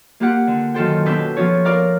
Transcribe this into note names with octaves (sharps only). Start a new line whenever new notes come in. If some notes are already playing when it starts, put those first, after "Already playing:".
A#3 F4 G4 F#5
D3
F#2 D#3 F4 A4 C5 G5
B2 C#4 D4 B4 E6 G6
F3 B3 C#4 F4 C#5
A#4 D5 F5 A#5